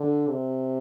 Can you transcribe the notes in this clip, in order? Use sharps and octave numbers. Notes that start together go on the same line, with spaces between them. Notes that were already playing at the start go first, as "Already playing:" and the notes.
Already playing: D3
C3